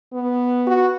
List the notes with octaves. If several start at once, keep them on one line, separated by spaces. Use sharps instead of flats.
B3
F#4